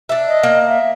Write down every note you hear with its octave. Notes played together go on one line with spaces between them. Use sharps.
D4 E5
D#5
A#3
E5